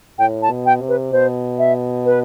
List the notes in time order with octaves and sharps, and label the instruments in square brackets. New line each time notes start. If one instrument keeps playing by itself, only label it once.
[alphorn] A2 [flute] G5
[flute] A5
[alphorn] B2
[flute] G5
[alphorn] C3
[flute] B4
[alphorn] B2 [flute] C5
[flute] E5
B4